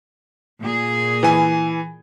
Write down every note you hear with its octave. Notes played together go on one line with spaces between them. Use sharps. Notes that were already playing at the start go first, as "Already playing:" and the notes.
A#2 G#4
E3 G#5